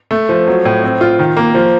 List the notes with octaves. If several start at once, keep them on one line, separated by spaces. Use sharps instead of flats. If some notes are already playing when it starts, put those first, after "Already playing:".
A3
F3
F#3
A2
C4
F4
D#3
A#3
F3